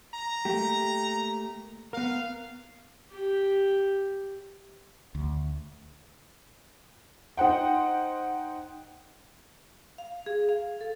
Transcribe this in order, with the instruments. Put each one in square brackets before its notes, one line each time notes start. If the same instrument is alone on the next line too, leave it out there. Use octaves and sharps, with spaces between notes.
[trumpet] A#5
[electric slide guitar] A3 A#3 G4
[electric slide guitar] B3 A#4 [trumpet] F5
[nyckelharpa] G4
[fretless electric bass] D2
[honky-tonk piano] D#4 C5 F#5 G5
[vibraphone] F5
G#4
F5
A4